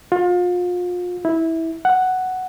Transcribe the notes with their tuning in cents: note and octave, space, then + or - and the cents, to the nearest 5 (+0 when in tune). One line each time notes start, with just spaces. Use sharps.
F4 +35
E4 -15
F#5 +5